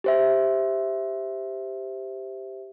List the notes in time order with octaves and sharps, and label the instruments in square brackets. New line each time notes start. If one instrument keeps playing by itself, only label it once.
[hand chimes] G4 C5 E5